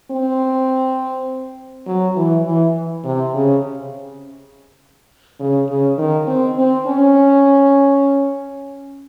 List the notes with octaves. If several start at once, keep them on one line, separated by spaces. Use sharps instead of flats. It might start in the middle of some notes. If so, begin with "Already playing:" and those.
C4
F#3
E3
E3
C3
C#3
C#3
C#3
D#3
C4
C4
C#4